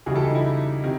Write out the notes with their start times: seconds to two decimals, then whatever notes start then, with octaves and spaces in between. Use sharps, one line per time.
0.06 C#2 C#3 E3 G3 F#4 G#4
0.16 G4 A4
0.25 D#4
0.35 E4
0.83 C3 D#3